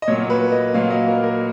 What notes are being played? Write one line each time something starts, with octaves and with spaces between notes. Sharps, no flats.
D#5
A#2 F#3 A#3 C#5
B4
D#5
A#2 F#3 A#3 F5
D#5
A#4
A#4